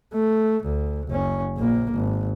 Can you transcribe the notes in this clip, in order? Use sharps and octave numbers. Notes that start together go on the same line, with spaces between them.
A3
D2
F#1 C#4
A#1 A#3
G#1